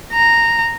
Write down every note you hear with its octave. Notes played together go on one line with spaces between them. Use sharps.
A#5